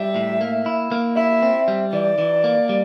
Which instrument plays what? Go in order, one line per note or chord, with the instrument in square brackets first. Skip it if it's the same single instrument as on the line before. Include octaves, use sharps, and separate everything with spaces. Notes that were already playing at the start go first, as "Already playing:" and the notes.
Already playing: [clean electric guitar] G3 [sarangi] E5
[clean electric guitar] A2
A#3
E4
A#3
[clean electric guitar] E4 [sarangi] E5
[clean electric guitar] C4
G3
[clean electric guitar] E3 [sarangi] D5
[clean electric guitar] E3
A#3
G3